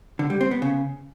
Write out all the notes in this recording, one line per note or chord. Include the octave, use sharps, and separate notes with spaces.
D3
G3
C4
B3
C#3